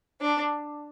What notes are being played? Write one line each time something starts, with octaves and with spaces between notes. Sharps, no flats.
D4